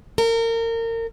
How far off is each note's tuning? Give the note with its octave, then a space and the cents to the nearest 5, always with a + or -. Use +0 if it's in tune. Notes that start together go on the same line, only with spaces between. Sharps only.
A#4 -30